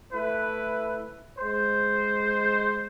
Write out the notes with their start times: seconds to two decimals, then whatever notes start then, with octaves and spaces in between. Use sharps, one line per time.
0.13 A3 E4 B4
1.39 G#3 C5